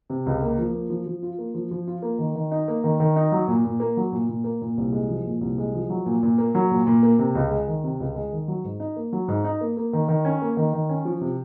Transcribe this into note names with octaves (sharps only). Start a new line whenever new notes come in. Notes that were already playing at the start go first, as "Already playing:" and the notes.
C3
C#2
A#3
F3
A#3
F3
F3
F4
A#3
F3
F3
F4
A#3
D#3
D#3
D#4
A#3
D#3
D#3
D#4
F#3
A#2
A#2
A#3
F#3
A#2
A#2
A#3
A#2
C2
G#3
F3
A#2
C2
G#3
F3
F#3
A#2
A#2
A#3
F#3
A#2
A#2
A#3
C3
C#2
G#3
D#3
C3
C#2
G#3
D#3
F#3
G#2
D#4
A#3
F#3
G#2
D#4
A#3
A#3
D#3
D#3
C#4
A#3
D#3
D#3
C#4
F3
C3